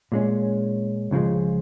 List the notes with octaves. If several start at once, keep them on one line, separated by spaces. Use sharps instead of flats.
A#2 G#3 C#4
C#2 C#3 F3 G#3